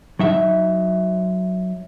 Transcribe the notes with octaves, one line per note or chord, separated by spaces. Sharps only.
F#3 D#4 E5